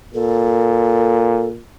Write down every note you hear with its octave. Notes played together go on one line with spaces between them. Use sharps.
A#2 A4